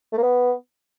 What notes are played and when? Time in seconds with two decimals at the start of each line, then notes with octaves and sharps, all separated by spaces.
0.12 A3
0.18 A#3
0.23 B3